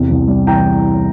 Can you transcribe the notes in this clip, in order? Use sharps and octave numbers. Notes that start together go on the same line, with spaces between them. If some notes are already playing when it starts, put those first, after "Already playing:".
Already playing: E2 C3
C2
G3
E3 G5 A#5